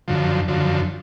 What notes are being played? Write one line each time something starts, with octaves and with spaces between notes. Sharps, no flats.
F#2 D3 F3
F#2 D3 F3